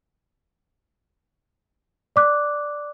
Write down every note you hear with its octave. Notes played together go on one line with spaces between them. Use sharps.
D5 D6 F#6